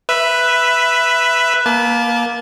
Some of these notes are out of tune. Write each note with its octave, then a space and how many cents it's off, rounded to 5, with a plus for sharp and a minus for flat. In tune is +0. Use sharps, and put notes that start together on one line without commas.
B4 +0 E5 +10
A#3 +20 A5 -30